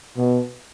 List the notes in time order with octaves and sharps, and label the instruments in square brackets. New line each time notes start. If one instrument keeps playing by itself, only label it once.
[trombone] B2